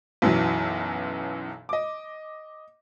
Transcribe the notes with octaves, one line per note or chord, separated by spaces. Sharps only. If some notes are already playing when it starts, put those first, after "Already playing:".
B1 F#2 E3 F#3
D#5 D6